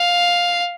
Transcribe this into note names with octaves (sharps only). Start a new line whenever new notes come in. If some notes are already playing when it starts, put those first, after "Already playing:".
Already playing: F5